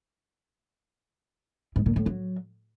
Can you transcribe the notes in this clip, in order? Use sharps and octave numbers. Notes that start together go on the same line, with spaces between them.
G#2
A#2
A2
F#3